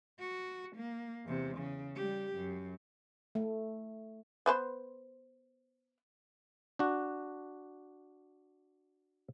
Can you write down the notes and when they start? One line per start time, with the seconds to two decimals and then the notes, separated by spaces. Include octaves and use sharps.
0.20 F#4
0.76 A#3
1.26 E2 C3
1.57 C#3
1.96 G3 G4
2.36 F#2
3.35 A3
4.46 B3 B4 C5
6.79 D4 F#4